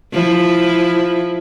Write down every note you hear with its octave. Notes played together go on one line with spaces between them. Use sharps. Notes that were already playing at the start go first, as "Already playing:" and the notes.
F3 E4